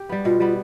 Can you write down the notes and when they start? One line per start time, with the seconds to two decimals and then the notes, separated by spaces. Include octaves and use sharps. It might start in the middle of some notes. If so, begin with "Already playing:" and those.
Already playing: G4
0.09 G3 B3
0.25 B2 F4
0.40 G3 B3